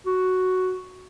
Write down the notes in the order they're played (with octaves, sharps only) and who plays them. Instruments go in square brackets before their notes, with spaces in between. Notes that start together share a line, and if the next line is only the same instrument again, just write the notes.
[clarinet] F#4